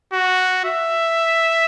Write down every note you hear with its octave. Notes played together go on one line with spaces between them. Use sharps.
F#4
E5